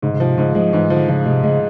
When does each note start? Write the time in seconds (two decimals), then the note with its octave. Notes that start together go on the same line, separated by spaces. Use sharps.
0.02 G#2 C#3
0.14 C#3
0.20 C3 F3
0.38 G#2 C#3
0.55 F3 G#3
0.73 G#2 E3
0.90 D3 F3
1.08 C#3 F3
1.25 C3 G#3
1.44 C#3 G#3